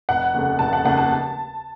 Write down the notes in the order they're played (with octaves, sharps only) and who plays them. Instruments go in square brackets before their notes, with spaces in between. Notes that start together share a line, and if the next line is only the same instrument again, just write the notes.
[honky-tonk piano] F1 F#5
D#2 C#3 A3
F1 A5
F#5
D#2 C#3 A3 F#5
A5